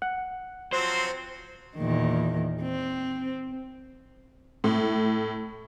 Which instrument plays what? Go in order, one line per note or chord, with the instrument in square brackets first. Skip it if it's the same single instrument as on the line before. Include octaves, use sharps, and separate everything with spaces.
[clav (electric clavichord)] F#5
[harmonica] F3 F#3 C4 [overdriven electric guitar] C5
[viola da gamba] E2 A#2 D#3
C4
[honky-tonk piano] A2